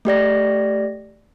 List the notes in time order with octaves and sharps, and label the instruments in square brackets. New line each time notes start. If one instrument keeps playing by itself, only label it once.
[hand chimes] A3 G4 D5 A#6